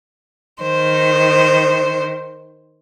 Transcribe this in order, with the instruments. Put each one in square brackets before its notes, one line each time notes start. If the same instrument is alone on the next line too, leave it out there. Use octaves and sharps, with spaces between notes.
[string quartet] D#3 C5